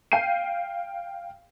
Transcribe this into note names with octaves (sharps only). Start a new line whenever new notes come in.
F5 G5 G6 C7 D#7